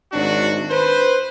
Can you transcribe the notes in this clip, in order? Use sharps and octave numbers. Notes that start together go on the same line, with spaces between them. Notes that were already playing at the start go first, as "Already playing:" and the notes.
G#1 F#3 D4 F#4
B4 C5